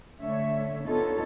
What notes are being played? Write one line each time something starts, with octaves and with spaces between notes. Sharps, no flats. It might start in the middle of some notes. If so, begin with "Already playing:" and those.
D3 A3 C#5 E5
D3 B3 D#4 F4 A4 C#5